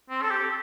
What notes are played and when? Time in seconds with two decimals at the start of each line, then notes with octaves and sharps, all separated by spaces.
0.10 C4
0.22 A4
0.31 G4